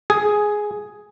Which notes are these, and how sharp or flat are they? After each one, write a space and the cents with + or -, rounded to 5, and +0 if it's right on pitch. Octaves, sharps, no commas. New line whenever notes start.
G#4 +5